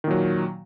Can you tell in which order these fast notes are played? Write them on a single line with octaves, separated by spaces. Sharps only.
D#3 A#2 F#3